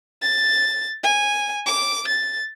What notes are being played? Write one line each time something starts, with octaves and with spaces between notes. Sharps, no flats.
A6
G#5
D6
A6